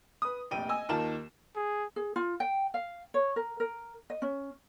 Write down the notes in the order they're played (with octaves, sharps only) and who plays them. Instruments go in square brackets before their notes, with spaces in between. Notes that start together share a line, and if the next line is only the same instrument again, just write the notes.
[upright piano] B4 D#6
F1 A#1 G5 D#7
D#5 G#5 E6
D#2 D#3 F4 A#4 A5 E7
[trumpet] G#4
[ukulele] G#4
F4
G5
F5
C#5
A#4
A#4
D#5
C#4